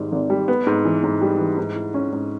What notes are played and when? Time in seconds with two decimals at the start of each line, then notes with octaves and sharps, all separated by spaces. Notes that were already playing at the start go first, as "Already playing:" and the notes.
Already playing: G#1 G#2 G3
0.12 G#1
0.30 G3
0.48 B3
0.67 G#2
0.85 E3
1.04 G#2
1.21 G3
1.39 E3
1.58 G#2
1.76 E4
1.94 C#4
2.12 G#2